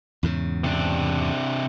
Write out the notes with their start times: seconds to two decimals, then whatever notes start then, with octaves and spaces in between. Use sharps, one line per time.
0.23 E2 G#2 C#3
0.64 C3 D4